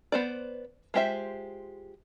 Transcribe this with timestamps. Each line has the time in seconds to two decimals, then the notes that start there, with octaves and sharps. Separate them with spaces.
0.12 B3 C5 D5
0.94 G#3 F4 G4 C5 E5